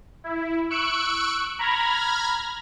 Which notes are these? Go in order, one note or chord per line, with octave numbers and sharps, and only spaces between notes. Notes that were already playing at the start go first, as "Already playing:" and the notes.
E4
C#6 E6 F#6 C#7 D7
A#5 B5 F6 G#6 A#6